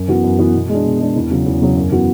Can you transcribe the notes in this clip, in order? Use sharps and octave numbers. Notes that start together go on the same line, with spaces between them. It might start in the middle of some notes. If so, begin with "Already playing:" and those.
Already playing: F#2
E3 B3 F#4
F#2
E3 B3 F#4
B2
G#3 D4
B2
G#3 D4
E2
C#3 F#3
E2
C#3 F#3
F#2
E3 B3 F#4